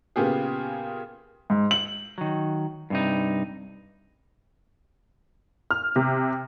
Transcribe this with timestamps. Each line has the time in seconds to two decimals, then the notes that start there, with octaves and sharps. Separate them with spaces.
0.16 A#2 C#3 B3 G4 G#4
1.50 G#2
1.71 F#7
2.18 D#3 F#3
2.90 G2 C3 D#4
5.71 F6
5.96 C3